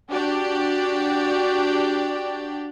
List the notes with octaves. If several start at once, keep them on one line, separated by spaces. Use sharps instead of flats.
D4 F#4 G4 D5